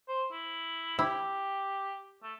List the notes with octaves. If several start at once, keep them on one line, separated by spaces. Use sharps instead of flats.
C5
E4
E4 G4
A3